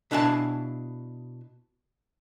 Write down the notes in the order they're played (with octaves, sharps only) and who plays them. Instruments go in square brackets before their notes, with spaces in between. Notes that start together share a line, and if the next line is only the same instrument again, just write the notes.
[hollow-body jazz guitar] B2 D4 E4 F5 G#5 A5